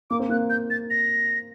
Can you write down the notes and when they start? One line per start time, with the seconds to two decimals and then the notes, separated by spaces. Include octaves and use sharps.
0.10 A#3 D6
0.19 C4
0.29 A#3 F#6
0.50 G6
0.70 A6
0.90 A#6